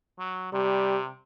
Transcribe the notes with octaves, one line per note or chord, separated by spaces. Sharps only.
F#3
C3 G3